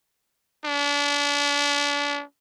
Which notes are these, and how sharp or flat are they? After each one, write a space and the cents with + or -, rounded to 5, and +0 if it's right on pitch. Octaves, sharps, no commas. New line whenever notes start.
D4 -35